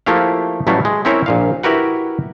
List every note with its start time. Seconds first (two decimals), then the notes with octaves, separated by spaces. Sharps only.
0.06 F3 A3 A#3 E4 G4 F5
0.67 A1 F#3 G3 A3 E4 F5
0.85 G#3
1.05 C4 C#4 E4 A#4 C5 C#5
1.26 A#1 A#2 F5
1.63 E4 F#4 G4 A#4 B4 F#5